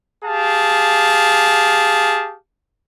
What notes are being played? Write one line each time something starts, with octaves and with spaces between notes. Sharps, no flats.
G4 G#4 F5 A5